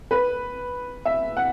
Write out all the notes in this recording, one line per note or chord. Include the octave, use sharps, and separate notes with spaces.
B4
E5
F#5